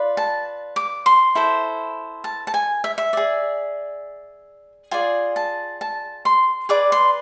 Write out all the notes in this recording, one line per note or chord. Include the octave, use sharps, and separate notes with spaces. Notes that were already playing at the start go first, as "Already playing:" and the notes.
Already playing: F4 B4 D5
A5
D6
C6
E4 A4 C5
A5
A5
G#5
E5
E5
G#4 D5
F4 G#4 D5 G#5
A5
A5
C6
G#4 B4 D5 D6
C6